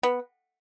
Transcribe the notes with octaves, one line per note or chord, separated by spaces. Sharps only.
B3